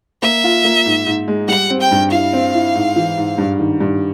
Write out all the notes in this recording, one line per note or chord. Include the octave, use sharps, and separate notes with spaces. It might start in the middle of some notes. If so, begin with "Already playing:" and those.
A#3 E5
F4
A#3
G#2
G#2
G#3
G3 F#5
C4
G5
G2
E4 F5
C4
E4
G#2
E3
G#2
G2
D#3
G2